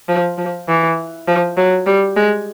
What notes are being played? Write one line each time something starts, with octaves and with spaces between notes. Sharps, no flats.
F3
F3
E3
F3
F#3
G3
G#3